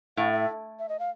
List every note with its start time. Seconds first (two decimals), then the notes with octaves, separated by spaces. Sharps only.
0.17 A2 F5
0.33 E5
0.79 E5
0.89 D#5
0.99 F5